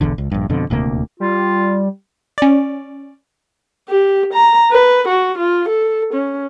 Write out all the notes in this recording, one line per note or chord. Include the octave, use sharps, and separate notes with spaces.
E1 B1 E2 D3
C#2
A#1 G2
F2 B2 D3
D#1 D2 C3 A#3
G3 F4
C#4 D5
G4
A#5
B4
F#4
F4
A4
C#4